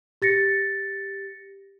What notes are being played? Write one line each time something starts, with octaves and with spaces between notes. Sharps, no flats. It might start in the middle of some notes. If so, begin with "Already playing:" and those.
G4 A6 A#6 C#7